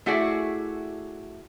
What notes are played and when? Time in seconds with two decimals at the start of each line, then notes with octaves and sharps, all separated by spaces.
0.06 A3 E4 F#4 G#4 D5